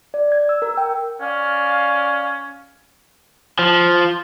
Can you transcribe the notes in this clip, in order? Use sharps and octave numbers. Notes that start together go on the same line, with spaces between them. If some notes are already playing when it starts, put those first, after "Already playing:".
D5
G#6
E6
A#4
G5
C#4 D5 F5
F3